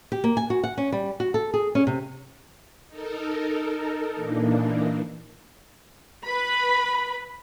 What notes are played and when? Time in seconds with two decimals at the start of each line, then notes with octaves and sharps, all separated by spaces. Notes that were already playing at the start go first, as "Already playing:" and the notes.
0.12 G4
0.24 A#3
0.37 G#5
0.50 F#4
0.64 F#5
0.78 C#4
0.92 G3
1.20 F#4
1.34 A4
1.54 G#4
1.75 C#4
1.87 C3
2.88 D#4 A4 A#4
4.14 A#2 E3 A#3 D4 D#4
6.24 B4 B5